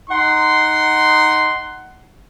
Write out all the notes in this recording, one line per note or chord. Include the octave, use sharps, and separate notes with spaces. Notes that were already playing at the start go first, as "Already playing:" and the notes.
D#4 F#5 C6